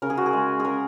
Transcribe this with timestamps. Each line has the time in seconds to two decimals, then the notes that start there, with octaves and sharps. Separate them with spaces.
0.02 C#3 A#4
0.10 G#4
0.17 F#4
0.26 G#4
0.33 G#3
0.60 G#4
0.65 C#3 A#4